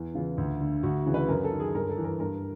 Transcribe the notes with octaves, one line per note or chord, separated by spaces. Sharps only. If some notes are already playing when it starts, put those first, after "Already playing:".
Already playing: E2
C#3 E3 F4
D2
D3
D2 F#4
C#3 E3
B4
F#2 A#4
A4
D#3
G#4
G2 A#4
A4
E3
A#4
G2 A#4